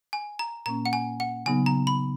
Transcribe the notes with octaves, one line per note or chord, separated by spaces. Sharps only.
G#5
A#5
A#2 A#3 C#4 A#5
F#5
G#5
F#5
C#3 F#3 B3 D#4 G#4 G#5
A#5
B5